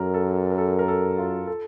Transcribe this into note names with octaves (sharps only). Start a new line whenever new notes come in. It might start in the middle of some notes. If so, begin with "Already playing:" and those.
Already playing: F#2 A4 A#4
A4
A#4
A4
A#4
A4
F4
A4